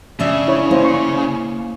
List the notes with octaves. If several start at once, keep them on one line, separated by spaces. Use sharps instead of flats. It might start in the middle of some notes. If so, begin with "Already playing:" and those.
C#3 D4 D5 E5
E4 C#5 B5
A#3 E4 C5 D5
C#6